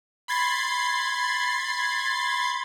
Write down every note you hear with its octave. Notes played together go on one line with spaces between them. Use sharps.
B5 C6 G#6 A6 C7